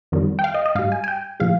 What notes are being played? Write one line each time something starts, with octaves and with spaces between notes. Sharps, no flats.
F2 D#3 G3
G5
F5
D#5
D#5
G#2 G3 F5
G#5
G#5
G5
A#2 F3 G#3 F5